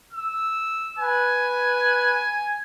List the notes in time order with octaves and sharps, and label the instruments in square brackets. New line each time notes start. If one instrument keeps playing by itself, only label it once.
[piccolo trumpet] E6
[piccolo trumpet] B4 [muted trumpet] G#5